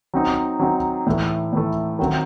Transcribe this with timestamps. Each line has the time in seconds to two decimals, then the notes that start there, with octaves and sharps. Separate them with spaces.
0.14 F#3 C4 D#4
0.59 F#3 C4 D#4
1.06 A2 E3 A3
1.53 A2 E3 A3
1.99 D#3 F#3 C4